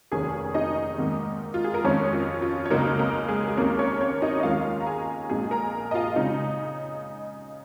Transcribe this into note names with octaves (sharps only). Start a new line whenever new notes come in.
F1 D#2 D#3 C#4 G#4 G#5
D#4 D#5
G#2 D#3 A#3
F4
G#4
A#4
F2 D#3 G#3 C#4 C#5
F4
F4
C#5
C#2 C#3 G#3 A#3 D#4 A#4
A#3 A#4
G#3 G#4
G#4
D#2 D#3 G#3 A#3 C#4 A#4
C#4 C#5
C#4 C#5
D#4 D#5
D#5
D#2 D#3 G#3 C#4 F4 F5
A#5
G#4 G#5
A#1 A#2 G#3 D#4 G#4 G#5
A#4 A#5
D#5
F4 F5
C#3 G#3 D#4 D#5